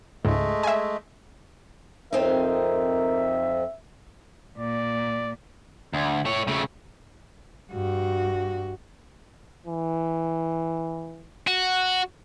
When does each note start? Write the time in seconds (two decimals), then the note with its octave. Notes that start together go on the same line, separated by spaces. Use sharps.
0.25 C#2 G#2 G#3 A3
0.63 E5 G#5
2.13 F2 C4 D#4 A#4 E5
4.58 A#2 D5
5.93 D2
6.25 A3 C#5
6.48 C#3 A3
7.73 G2 F#4
9.67 E3
11.47 F#4